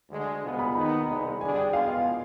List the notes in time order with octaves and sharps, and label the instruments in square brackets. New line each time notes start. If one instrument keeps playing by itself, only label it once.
[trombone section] D2 D3 G#3
C2 B2 B3 F4 G#4
[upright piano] B5
[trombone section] D#2 D#3 B3 D#4 [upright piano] B5
[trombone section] C2 B2 G#3
[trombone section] D3 G3 D4 G#4 [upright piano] G#5
[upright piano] G5
[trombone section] B2 G#3 B3 F4 [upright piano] F5